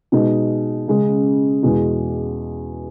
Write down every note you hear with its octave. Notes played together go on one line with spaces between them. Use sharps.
B2 G#3 D#4
C#3 G#3 C#4
E2 B2 G#3